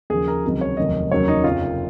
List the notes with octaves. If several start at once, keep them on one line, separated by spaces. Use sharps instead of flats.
D#2 C#3 F3 G#4
A#4
C#2 C3 D#3 F#3
C#5
F1 D#2 D#3 F#3 D#5
F1 D#2 C#3 F#3 C#5
D#4
F#1 F2 C3 F4